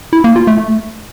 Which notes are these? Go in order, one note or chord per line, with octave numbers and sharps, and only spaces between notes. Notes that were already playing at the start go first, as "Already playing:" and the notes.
E4
A#3
F4
A3